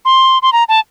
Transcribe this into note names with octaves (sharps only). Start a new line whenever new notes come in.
C6
C6
A#5
A5